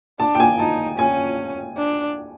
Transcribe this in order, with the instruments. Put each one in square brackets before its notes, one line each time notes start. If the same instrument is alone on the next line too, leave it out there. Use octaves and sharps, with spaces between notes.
[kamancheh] D4 [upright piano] A5
[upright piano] G5
G#5
[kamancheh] D#4 [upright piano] A5
[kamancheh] C#4 [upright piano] G#5
[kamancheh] D4